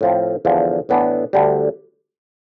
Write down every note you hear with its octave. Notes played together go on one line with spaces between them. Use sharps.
A2 F3 C4
E2 D3 F3
A2 E3 B3 D4
D2 D3 G3